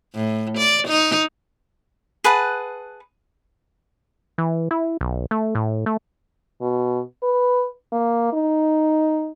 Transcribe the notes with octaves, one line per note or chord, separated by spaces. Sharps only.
A2
D5
D#4
G#4 B4 F#5 A5
E3
E4
B1
A3
A2
A3
B2
B4
A#3
D#4